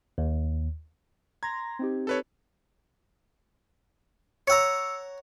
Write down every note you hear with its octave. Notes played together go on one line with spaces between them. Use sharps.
D#2
A#5 C6 G#6 A#6
C4 D#4 G4
A4 B4 C#5
C#5 F#5 A#5 E6 C#7